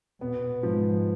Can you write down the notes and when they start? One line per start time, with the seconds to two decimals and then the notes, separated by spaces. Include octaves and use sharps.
0.21 B2 B3
0.63 G#2 F3